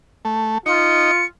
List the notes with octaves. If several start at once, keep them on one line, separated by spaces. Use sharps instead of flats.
A3
D#4 F4 C#7